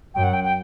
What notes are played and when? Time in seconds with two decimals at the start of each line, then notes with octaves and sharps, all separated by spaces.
0.15 F#2 G5
0.24 F#5
0.33 G5
0.44 G5